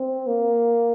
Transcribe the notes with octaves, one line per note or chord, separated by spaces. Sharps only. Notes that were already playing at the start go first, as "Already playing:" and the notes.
Already playing: C4
A#3